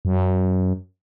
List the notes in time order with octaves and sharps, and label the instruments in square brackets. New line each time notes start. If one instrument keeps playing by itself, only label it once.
[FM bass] F#2